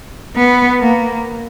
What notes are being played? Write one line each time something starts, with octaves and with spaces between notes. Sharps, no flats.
B3
A#3